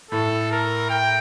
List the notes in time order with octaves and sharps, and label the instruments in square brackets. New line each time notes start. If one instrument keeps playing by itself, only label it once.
[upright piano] A2 [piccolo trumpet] A4
[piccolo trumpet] A#4
G5